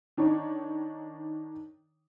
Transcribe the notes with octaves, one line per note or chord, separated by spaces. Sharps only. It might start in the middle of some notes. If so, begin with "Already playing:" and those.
D#3 D4 D#4 C#5